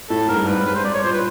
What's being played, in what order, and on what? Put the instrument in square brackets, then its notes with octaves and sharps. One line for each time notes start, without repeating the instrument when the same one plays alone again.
[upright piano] A2 [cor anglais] A4
[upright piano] G#2 [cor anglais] A#4
[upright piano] G2
[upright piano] G#2 [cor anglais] B4
[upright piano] G#2
[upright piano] G2 [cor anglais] B4
[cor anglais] C5
[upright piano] G2 [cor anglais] D5
[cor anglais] C#5
[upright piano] A#2 [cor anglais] C5
[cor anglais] B4